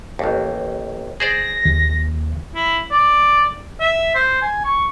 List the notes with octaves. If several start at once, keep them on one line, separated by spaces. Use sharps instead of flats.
A1 D#2
G#4 C5 D5 A#6
D#2
E4
D5
E5
C5
G#5
C#6